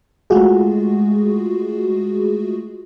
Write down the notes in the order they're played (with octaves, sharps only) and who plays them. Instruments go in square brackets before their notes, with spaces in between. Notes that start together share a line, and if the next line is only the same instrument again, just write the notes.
[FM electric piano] G#3 A3 F4 F#4 G#4